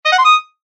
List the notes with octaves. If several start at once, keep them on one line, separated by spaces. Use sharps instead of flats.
D#5
F#5
C6
D#6